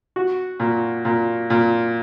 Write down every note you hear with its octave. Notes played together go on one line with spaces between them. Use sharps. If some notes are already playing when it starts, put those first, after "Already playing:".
F#4
A#2
A#2
A#2